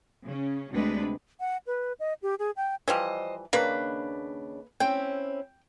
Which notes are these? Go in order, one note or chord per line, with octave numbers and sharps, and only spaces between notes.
C#3 C#4
D2 C3 G#3 D4 B4
F#5
B4
D#5
G4
G#4
G5
E3 F3 G3 C5 D#5
D#2 C#3 A#3 D4 B4
C4 C#4 E4 G5